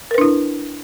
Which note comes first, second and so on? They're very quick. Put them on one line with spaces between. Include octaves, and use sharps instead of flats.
A#4 B4 D4 E4